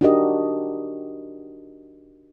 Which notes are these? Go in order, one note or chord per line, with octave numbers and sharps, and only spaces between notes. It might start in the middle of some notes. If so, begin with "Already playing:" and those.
D4 D#4 F#4 G4 A#4 D#5